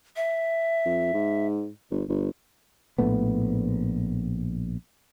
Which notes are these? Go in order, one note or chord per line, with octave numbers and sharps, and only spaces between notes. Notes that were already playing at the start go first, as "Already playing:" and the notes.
E5
F2
G#2
G1
G1
A#1 A2 A3 B3